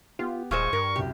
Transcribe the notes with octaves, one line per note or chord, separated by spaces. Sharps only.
B3 F4 G4
D#1 A#2 G#3 C5 C#6 F6 G#6 E7
G2 A#4
C2 F#2 G4